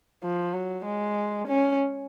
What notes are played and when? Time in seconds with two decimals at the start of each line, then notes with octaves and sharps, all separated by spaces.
0.23 F3
0.54 F#3
0.85 G#3
1.48 C#4